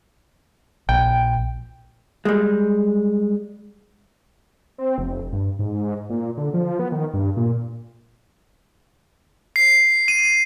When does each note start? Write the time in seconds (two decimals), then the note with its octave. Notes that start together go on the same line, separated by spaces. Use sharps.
0.89 A#1 G5
2.25 G3 G#3
4.78 C4
4.98 F1
5.33 G2
5.59 G#2
6.10 A#2
6.37 D3
6.54 F3
6.79 B3
6.92 D#3
7.14 G2
7.37 A#2
9.56 C7
10.08 D#7